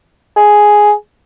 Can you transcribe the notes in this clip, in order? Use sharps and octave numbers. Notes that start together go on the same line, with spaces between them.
G#4